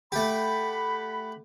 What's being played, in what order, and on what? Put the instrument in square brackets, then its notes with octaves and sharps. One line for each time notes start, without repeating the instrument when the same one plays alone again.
[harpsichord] A3 G4 [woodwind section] F#5 B5